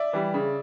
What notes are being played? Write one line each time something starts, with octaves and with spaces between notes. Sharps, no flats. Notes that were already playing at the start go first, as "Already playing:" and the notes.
Already playing: D5 E5
E3 G3
C#3